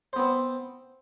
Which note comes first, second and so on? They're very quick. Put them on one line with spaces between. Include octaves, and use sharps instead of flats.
C5 B3 C4